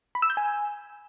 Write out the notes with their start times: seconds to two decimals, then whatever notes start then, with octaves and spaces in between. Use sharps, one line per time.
0.15 B5
0.22 E6
0.30 G6
0.37 G#5